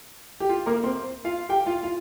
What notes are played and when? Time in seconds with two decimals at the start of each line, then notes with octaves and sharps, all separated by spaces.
0.40 G4
0.49 F4
0.66 A#3 A#4
0.84 C4 C5
1.24 F4 F5
1.49 G4 G5
1.66 F4 F5
1.83 F4 F5